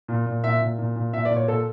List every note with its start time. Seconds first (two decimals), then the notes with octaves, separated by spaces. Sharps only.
0.08 A#2
0.26 A#2
0.44 A#2 E5
0.61 A#2
0.78 A#2
0.96 A#2
1.13 A#2 E5
1.25 D5
1.31 A#2
1.36 C#5
1.48 A#2 A4